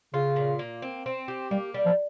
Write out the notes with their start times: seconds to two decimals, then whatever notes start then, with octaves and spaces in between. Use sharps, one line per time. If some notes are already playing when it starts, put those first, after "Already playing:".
0.14 C#3 F4
0.36 A#2
0.59 A#3
0.82 C4
1.06 C4
1.28 G4
1.51 G3 A#3
1.74 G3
1.86 F3